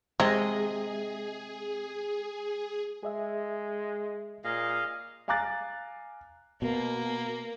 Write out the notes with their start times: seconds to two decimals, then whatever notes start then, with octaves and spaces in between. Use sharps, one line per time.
0.20 C3 G#3 G#4 D#5
3.03 G#3 G#4 D#5 E5
4.44 A#2 G#4 D#5 F5
5.28 F5 G#5 A#5 D6 F#6 A6
6.62 B2 A#3